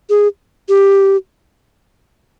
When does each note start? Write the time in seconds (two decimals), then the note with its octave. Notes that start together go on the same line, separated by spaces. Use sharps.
0.10 G#4
0.69 G4